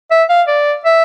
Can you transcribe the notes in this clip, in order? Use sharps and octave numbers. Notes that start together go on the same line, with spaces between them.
E5
F5
D5
E5